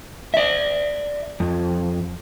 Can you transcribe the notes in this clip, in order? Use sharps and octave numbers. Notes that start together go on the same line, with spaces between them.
D5 E5
F2